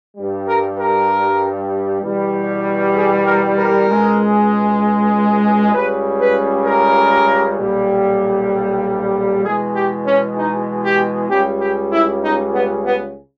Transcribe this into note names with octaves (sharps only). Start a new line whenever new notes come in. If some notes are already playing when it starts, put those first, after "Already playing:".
G2 G3
A#4
A#4
E2 B2 G3
G#4
A#4
A#4
C#2 B2 G#3
C#2 C#3 G3 B4
B4
A#4
B1 A#2 G3
E2 B2 G#3 G#4
G4
C#4
D#4
G4
C#2 C#3 G3 G4
G4
E4
D#4
B3
B3